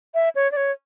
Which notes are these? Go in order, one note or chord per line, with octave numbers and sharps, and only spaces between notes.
E5
C#5
D5
C#5